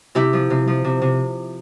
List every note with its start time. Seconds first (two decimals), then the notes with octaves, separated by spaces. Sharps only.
0.15 C3 E4 G4
0.33 F3
0.50 C3
0.67 F3
0.84 C3
1.02 C3